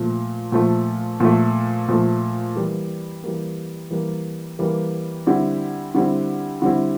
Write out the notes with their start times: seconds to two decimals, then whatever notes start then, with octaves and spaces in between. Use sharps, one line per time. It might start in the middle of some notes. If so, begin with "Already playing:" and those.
Already playing: A#2 F3 A3
0.52 A#2 F3 A3
1.20 A#2 F3 A3
1.88 A#2 F3 A3
2.56 E3 G3 A#3
3.23 E3 G3 A#3
3.91 E3 G3 A#3
4.59 E3 G3 A#3
5.26 D3 G3 C4 E4
5.95 D3 G3 C4 E4
6.62 D3 G3 C4 E4